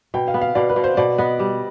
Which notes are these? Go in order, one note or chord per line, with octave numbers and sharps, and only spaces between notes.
B2 G5
F5
B3
F5
B2 D5
B4
B2
C5
B2 D5
B3 D#5
G3